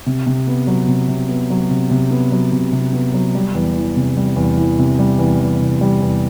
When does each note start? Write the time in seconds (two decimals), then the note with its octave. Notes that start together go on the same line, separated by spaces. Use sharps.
0.06 C3
0.27 C3
0.47 B3
0.67 F#3
0.88 C3
1.08 C3
1.29 B3
1.50 F#3
1.70 C3
1.90 C3
2.11 B3
2.32 F#3
2.52 C3
2.72 C3
2.93 B3
3.14 F#3
3.35 G3
3.55 E2
3.76 E3
3.96 C3
4.17 G3
4.36 E2
4.57 E3
4.79 C3
4.99 G3
5.19 E2
5.39 E3
5.61 C3
5.81 G3
6.01 E2